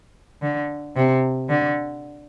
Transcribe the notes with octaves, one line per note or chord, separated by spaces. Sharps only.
D3
C3
D3